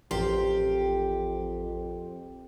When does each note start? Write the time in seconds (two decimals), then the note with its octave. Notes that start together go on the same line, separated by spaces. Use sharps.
0.11 A1 F2 G4 A#4 C6